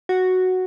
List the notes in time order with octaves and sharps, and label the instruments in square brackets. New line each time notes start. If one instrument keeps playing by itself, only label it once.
[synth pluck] F#4